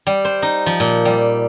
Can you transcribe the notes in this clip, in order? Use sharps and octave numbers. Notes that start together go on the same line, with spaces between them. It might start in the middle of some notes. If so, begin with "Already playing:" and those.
G3
C5
D#4
F3
A#2
G3